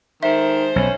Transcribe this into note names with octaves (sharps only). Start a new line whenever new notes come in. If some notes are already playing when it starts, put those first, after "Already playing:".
D#3 G#3 A4 C5 E5
B1 C#4